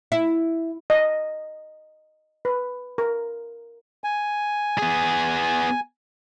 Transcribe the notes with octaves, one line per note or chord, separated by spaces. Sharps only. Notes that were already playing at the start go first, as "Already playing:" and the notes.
E4
D#5
B4
A#4
G#5
B3 G#4